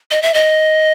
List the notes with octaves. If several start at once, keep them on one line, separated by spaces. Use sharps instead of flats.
D#5
E5
D#5